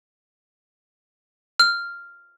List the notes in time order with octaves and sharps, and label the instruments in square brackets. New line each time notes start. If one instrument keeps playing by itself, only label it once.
[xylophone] F6